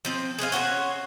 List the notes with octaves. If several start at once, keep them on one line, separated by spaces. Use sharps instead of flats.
F3 C4 C5
G#4 B4 C5 F5
C#4 F#4 C5 C#5